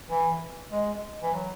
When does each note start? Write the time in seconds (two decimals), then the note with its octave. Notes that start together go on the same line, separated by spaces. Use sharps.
0.10 E3
0.72 G#3
1.23 E3
1.34 F#3